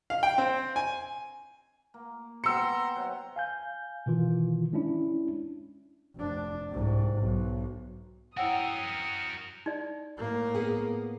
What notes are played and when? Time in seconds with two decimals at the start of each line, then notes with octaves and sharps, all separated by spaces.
0.10 F5
0.23 G5
0.38 C4
0.76 G#5
1.94 A#3
2.44 B3 C4 A#5 C6 E6 C#7
2.95 C3 F#3 F#5
3.36 F5 G#5 G6
4.06 B2 D#3 E3 F4
4.73 G#3 C#4 D4 E4
6.16 F1 D4
6.72 C2 G#2
7.18 B1
8.37 E4 F#4 A#4 C#5 F#5 G5 D#6 E6
9.66 D#4 D5
10.18 A2 A#3
10.55 B3 G#4